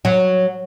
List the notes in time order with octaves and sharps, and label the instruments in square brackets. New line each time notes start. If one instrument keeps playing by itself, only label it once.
[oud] F#3